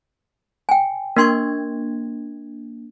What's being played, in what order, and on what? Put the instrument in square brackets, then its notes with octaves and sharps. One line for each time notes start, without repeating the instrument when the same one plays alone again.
[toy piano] G5 G#5
[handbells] A#3 D4 G#6 [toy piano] A#4 C6 C#6